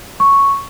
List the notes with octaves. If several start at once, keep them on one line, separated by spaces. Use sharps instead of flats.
C#6